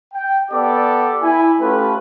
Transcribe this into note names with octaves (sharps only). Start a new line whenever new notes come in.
G5
B3 G4 A4 D5 D6
E4 G#5
A3 C#4 F4 G4 A4 B4